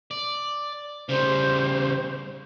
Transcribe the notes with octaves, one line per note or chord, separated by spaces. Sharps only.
D5
C#3 G3 C5